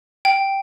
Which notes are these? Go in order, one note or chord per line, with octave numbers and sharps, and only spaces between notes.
G5